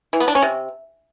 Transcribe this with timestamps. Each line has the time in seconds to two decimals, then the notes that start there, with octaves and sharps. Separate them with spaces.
0.13 E3
0.20 B3
0.28 D4
0.35 C#4
0.42 C3